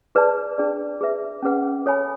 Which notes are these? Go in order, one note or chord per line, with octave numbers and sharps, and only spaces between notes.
G#4 B4 D5 A5
D4 G#4 D5
G#4 B4 E5
C#4 G#4 B4 F#5
A4 C#5 G#5 B5